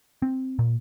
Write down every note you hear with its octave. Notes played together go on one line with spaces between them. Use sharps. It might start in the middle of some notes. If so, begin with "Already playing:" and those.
C4
A#2